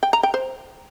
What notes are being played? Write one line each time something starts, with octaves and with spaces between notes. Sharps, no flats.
G5
A#5
G5
C5